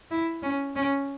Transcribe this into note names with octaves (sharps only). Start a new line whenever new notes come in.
E4
C#4
C#4